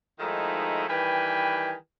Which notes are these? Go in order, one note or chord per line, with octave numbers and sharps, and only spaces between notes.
D#3 F3 G#3 A3 D#4 E4
D#3 E3 G3 B4 G5 G#5